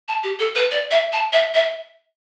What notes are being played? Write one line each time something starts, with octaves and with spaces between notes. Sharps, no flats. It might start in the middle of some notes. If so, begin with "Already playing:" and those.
A5
G4
A4
B4
D5
E5
A5
E5
E5